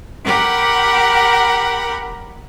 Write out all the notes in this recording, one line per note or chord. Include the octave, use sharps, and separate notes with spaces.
G4 A#4 F#5 B5